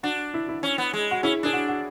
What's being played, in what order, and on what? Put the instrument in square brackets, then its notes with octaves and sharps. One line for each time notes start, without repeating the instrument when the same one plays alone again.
[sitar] D4 [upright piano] F#4
[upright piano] E4
E4
[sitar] C#4
B3
G#3
[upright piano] F#4
[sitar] C#4 [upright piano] E4
[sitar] D4 [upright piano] G#4
[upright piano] F#4
F#4